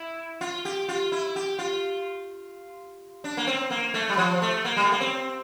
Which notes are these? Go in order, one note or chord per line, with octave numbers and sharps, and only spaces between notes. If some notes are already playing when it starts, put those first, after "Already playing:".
Already playing: E4
F4
G4
F4
E4
G4
F4
D4
A#3
C4
A#3
A3
G3
F3
A3
A#3
G3
A3
A#3
C4